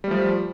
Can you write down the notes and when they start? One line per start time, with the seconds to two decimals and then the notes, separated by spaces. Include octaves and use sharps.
0.04 G3
0.07 A3
0.11 F3